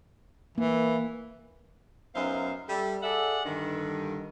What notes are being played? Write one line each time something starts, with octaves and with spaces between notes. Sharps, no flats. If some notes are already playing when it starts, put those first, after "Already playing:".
E3 A#3
F#2 B3 D#4 C5 E5 F5
G3 A4 E5
G#4 A4 D5 E5 F#5
G2 D3 D#3